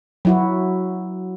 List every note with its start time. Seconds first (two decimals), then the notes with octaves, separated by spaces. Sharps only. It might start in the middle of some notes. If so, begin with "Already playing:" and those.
0.25 F#3 E4 F#4